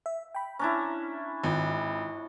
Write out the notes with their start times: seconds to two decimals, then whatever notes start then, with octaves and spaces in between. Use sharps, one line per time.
0.06 E5
0.35 G5 B5
0.59 C#4 D4 E4 A#5 F6
1.44 G#1 D#3 F4